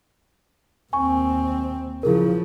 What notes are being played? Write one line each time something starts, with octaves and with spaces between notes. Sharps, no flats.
D#2 C4 G#5 C#6
C#3 F3 E4 G#4 A#4